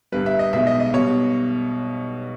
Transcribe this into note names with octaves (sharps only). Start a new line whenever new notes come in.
G1 G2 G3 B4
E5
D#5
B1 B2 G#3 E5
D#5
D#5
B1 B2 G3 C#5